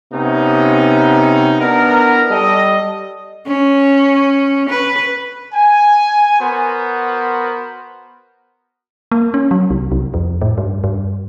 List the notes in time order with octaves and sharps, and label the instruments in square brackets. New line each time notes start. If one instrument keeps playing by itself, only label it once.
[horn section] C3 B3 C#4 D#4
B3 D4 E4 A#4
G3 A4 D#5
[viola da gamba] C#4
B4
[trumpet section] G#5
B3 F#4 A#4 C5
[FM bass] A#3
C#4
F#3
C2
C2
F2
A2
G2
G2